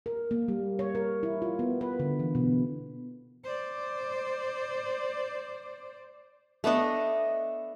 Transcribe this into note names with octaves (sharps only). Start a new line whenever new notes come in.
A#4
A#3
G3
C#5
A#4
E4
F4
B3
B4
D3
E3
B2
C5 D5
A3 B3 D4 D#5